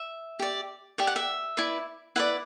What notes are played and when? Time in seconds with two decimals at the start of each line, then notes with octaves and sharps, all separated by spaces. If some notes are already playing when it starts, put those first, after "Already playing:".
Already playing: E5
0.39 G4 D5
0.98 G4 D5 E5
1.07 F#5
1.16 E5
1.57 E4 B4 D5
2.16 E4 B4 D5 F#5